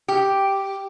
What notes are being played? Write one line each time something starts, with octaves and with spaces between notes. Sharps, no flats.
G4